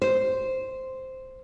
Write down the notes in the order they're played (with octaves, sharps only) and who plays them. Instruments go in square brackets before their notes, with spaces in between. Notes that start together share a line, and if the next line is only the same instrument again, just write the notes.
[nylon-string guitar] C5